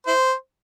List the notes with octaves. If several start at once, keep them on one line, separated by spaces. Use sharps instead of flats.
E4 C5